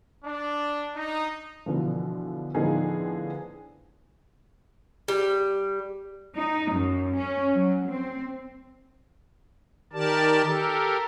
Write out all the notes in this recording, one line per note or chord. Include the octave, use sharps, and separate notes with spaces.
D4
D#4
B2 D3 E3 F3
A2 D3 F3 B3 D#4 G#4
G3
D#4
F#2
C#4
F#3
C4
D#3 G4 A#4 D5 A5
G4 A4 A#4